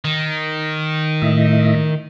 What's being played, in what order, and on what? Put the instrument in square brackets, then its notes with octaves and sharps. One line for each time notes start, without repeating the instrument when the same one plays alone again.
[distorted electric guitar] D#3
[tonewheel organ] A2 D#5 E5